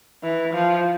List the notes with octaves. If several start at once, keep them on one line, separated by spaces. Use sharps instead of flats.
E3
F3